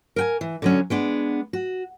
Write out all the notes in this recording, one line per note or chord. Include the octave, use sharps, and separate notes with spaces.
A#4 G5 G#5
E3
D3 F#3 C#4
G#3 B3 D4
F#4